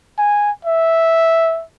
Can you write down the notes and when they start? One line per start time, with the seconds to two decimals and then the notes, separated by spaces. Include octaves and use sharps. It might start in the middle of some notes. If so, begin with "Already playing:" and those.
0.18 G#5
0.65 E5